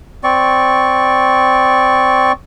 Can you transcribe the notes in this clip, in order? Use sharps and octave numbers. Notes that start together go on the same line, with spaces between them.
C4 D5 C#6